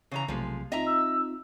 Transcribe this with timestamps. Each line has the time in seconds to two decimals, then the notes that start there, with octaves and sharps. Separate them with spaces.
0.12 C#3 E3 A#5
0.28 B1 C3 F3 G#3 A3
0.72 C4 D#4 F4 D#5 E5 A#5
0.86 E6